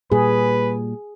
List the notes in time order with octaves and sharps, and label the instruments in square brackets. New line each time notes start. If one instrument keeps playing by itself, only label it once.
[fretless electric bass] A#2 G3 [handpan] G#4 [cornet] B4